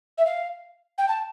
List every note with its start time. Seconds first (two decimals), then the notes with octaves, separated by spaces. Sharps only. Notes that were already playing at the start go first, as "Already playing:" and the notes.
0.17 E5
0.25 F5
0.98 G5
1.08 A5